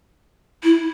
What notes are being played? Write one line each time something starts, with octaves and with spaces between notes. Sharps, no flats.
E4